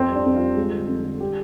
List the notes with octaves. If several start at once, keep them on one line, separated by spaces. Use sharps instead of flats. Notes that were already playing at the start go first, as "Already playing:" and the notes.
Already playing: F2 C4
G3
D4
F2
G3 F4
G#3
D3
F2
D3
G3 G4